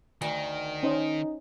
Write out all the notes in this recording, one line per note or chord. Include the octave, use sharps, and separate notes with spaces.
D2 D#3
C#4 D#4 C5 D#5